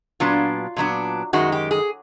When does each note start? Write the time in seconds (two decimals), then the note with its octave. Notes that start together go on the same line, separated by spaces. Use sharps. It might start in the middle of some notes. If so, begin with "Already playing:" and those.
0.20 A#2 F#3 B3 D4 F4
0.76 A#2 F#3 B3 D4
1.33 F#2 D#3 G#3 F#4
1.52 G4
1.71 G#4